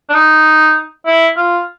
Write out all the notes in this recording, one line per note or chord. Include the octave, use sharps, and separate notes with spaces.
D4
D#4
E4
F4